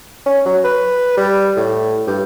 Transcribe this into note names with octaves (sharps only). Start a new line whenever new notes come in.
C#4
F#3
B4
G3
A2
G2